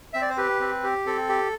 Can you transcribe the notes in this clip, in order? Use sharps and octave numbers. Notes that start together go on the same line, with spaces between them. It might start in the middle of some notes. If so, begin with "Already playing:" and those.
C4 E5
D5
C5
G4 B4
C4
G4
C4 A4
G4